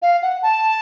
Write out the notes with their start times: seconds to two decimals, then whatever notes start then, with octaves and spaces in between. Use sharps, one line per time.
0.02 F5
0.22 F#5
0.43 A5